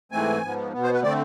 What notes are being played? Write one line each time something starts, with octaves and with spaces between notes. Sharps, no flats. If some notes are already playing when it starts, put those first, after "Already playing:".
G#2 E3 A3 C4 G#5
G#2 F3 B3
B2 B3
C5
B4
D3 A3 C4 D5